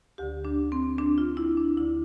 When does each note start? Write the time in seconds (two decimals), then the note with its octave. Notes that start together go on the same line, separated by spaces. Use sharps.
0.18 D2 D3 G4
0.45 D4
0.72 C4
0.98 D4
1.18 F4
1.37 E4
1.57 D4
1.77 D2 D3 E4